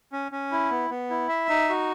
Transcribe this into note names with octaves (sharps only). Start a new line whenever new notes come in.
C#4
C#4
E4
B3
B3
E4
E5
D#4
F#4